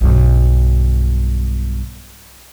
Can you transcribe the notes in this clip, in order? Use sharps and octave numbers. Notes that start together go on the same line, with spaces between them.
B1 G2